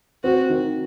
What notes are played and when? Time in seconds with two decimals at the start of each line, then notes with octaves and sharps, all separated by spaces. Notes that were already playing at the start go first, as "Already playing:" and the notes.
0.24 C4 F#4
0.50 D#3